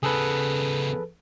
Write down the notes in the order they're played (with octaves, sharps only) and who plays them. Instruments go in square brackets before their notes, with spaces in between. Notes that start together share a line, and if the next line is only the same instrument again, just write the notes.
[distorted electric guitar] C#3 B3 [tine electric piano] G#4 A4 B4